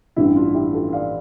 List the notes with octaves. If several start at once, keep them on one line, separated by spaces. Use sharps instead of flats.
A1 G2 D3 E4
D4 F4
E4 G4
F4 A4
D5 F5